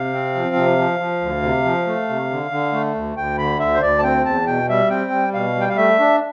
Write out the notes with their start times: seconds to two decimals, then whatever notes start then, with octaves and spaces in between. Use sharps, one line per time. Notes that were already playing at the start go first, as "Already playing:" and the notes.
Already playing: C3 F5
0.13 C4
0.35 F3
0.56 C3
0.78 F3
1.00 F3
1.21 D2
1.42 C3
1.64 F3
1.87 A3
2.09 C3
2.30 D3
2.51 D3
2.73 A3
2.95 D2
3.17 D2 G5
3.38 D3 B5
3.60 D2 E5
3.75 C5
3.82 D2 D5
3.99 A5
4.03 C4 G5
4.25 E2 A5
4.47 B2 G5
4.69 G3 E5
4.90 C4 G5
5.11 G3
5.33 B2 F5
5.56 G3
5.61 G5
5.69 F5
5.77 A3 E5
5.99 D4